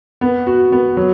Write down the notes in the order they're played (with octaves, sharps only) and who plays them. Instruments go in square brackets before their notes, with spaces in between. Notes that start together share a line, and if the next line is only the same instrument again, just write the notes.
[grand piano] B3
F#4
B3
F#3